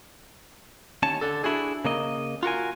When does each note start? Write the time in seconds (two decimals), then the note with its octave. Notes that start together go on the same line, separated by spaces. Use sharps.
1.03 D#2 C#4 C#5 A5
1.21 D3 A4
1.44 D4 E4 F#4 G#4
1.85 C#3 A#3 D#5
2.43 F4 F#4 A#4 G#5